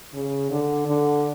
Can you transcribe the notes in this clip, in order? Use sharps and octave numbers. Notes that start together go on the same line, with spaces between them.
C#3
D3
D3